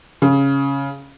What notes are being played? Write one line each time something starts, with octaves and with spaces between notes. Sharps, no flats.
C#3